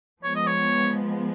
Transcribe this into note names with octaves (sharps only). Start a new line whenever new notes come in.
F3 G#3 B3 C#5
D#5
C#5